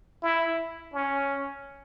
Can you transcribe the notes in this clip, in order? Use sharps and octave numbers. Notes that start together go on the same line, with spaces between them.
E4
C#4